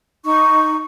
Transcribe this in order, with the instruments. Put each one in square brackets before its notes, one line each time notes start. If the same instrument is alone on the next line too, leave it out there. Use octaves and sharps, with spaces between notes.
[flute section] D#4 C#6